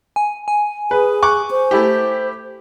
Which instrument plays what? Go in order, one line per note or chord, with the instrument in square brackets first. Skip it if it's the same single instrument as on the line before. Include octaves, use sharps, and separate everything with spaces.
[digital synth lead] G#5
G#5
[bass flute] G#4 [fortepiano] B4
[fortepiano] C#6 D6 F#6
[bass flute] C5
[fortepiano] A3 E4 G4